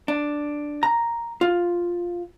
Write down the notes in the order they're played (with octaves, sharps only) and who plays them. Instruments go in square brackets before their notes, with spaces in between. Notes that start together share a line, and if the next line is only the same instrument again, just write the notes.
[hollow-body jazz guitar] D4
A#5
F4